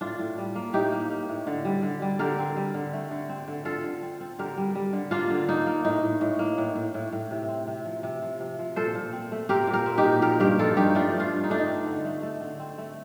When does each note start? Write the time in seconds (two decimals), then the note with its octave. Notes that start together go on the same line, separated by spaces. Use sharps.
0.01 A2 D4 F4
0.19 A2
0.38 G3
0.55 A#3
0.73 A2 D#4 G4
0.92 A#3
1.10 A#3
1.29 A2
1.47 D3
1.65 G3
1.83 D3
2.02 G3
2.19 D3 G4 A#4
2.38 C4
2.56 G3
2.74 D3
2.93 A3
3.11 D3
3.29 C4
3.48 D3
3.65 D3 F4 A4
3.83 D3
4.02 C4
4.20 C4
4.39 D3 G4 A#4
4.57 G3
4.75 G3
4.93 D3
5.11 A#3 D4 F4
5.30 D3
5.49 A#3 D#4
5.66 A#3
5.84 A2 D#4
6.03 A2
6.21 A2
6.39 A#3
6.58 A2
6.76 A2
6.94 A2
7.12 A2
7.31 C3
7.48 C4
7.67 C3
7.85 F3
8.03 C3
8.22 F3
8.40 C3
8.59 F3
8.76 A#2 A4 C5
8.95 A#2
9.13 C4
9.32 A3
9.49 C4 G4 A#4
9.67 A#2
9.73 G4 A#4
9.86 C4
9.98 D#4 G4
10.04 A#2
10.22 F3 G4 A#4
10.40 G2 G4 A#4
10.58 F3 F4 A4
10.77 G2 D#4 G4
10.95 A3 D4 F4
11.14 G2
11.20 D4 F4
11.32 G2
11.44 D#4
11.50 A3 D4
11.58 D#4
11.68 C4
11.86 D3
12.05 A3
12.23 A3
12.41 D3
12.59 C4
12.78 A3